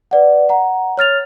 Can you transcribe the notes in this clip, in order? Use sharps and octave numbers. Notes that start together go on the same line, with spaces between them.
B4 D5 F#5
F#5 A#5
C#5 F6 A6 F7